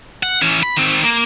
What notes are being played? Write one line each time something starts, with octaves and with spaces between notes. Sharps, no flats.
F#5
E3 C#4
B5
D#3 C4
A#3